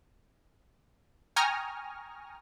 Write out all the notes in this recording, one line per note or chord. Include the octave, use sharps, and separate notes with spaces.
G5 G#5 A#5 C#6 D#6 F6